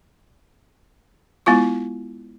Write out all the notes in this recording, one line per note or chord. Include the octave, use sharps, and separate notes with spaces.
G#3 B3 E4 F4 C#6